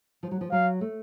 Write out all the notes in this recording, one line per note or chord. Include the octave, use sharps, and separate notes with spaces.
F3
F#3
F3
F#3 F5
A3